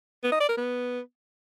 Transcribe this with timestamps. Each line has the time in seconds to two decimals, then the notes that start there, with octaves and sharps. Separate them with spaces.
0.24 B3
0.32 D#5
0.40 D5
0.49 A#4
0.57 B3